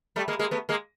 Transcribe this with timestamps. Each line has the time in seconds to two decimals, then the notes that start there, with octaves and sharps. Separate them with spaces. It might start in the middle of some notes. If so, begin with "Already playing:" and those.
0.16 G3 A3
0.28 G#3 A#3
0.39 G#3 A#3
0.51 A3 B3
0.69 G#3 A#3